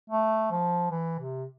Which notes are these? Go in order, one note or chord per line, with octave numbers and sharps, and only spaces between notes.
A3
F3
E3
C3